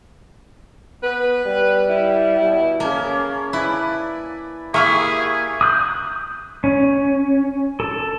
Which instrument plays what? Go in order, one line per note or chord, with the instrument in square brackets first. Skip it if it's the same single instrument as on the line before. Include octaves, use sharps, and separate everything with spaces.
[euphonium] B3 [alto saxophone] B4
[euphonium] G3
[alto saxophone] E4
[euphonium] B2
[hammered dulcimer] C#3 C#4 A5 [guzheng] A#3
[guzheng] E4 [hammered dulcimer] B4 D5 G#5
[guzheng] A#3 E4 G4 [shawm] G#4 [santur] E5 F5 C#6
[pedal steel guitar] D#6 F#6 G6
C#4
A4